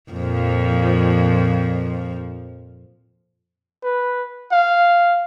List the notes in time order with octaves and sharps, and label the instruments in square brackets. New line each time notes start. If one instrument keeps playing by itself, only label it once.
[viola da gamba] F2 A#2 F3
[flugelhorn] B4
F5